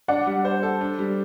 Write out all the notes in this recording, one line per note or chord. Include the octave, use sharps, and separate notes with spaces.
D4 D5 F#5
G3
C5
A4
D4
G3